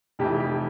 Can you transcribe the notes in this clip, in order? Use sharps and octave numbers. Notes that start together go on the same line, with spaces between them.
F1 F2 E3 G4
G4